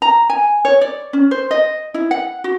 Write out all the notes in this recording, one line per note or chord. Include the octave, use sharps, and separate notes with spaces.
A#5
G#5
C#5
D5
C#4
C5
D#5
E4
F#5
F#4